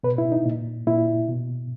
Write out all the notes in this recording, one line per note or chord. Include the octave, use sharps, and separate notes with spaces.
B2 B4
E4
D#4
A#2
A#2 E4
B2